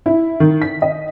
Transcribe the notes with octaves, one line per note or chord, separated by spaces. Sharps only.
E4
D#3
B6
D#5